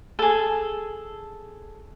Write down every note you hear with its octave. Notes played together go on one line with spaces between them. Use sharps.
G#4 A4